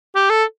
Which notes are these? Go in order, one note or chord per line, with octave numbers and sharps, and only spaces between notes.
G4
A4